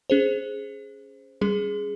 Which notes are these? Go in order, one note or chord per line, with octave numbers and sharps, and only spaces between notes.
C#4 G#4 C5
G3 C#4 G#4